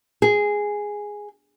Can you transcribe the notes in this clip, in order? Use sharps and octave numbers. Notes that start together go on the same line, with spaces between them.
G#4